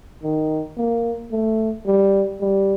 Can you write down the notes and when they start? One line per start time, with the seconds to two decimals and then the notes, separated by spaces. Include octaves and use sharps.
0.23 D#3
0.77 A#3
1.32 A3
1.87 G3
2.41 G3